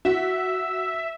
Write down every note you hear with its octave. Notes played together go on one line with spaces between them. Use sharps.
F#4 E5